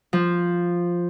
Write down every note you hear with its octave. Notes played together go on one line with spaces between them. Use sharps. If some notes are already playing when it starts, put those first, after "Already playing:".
F3